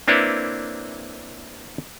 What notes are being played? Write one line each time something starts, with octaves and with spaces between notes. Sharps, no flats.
A#3 C4 D4 E4 B4 C#5